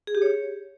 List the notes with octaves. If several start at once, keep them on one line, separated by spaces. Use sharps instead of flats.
G#4
G4
C#5